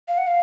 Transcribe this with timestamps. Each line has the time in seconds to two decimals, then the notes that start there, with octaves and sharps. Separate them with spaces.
0.08 F5
0.18 F#5
0.27 F5